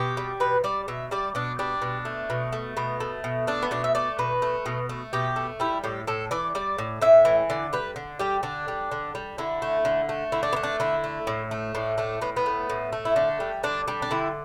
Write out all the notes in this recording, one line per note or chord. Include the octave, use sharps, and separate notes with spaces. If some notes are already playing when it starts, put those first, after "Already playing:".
Already playing: B2 G4
G3
B2 B4
G3 D5
B2 E5
G3 D5
B2 D4
G3 D4
B2
A3
B2
A3
B2 B3
A3
B2
A3 D4
B3
B2 D4
E5
A3 D5
B2 B4
A3
B2
A3
B2 G4
A3
G3 E4
A2 G4
A2 A4
E3 D5
G3 D5
A2
A2 E5
E3
D3 D5
G3 B4
D3
G3 G4
D3 D4
G3
D3
G3
D3 E4
A3
D3
A3
D3 E4
D4
B3
A3
D4
D3 E4
A3
A2
A3
A2 D4
A3 D4
A2 B3
B3
A3
A2
A3
E4
D3 D4
G3
D3 D4
G3 D4
D4
D3 E4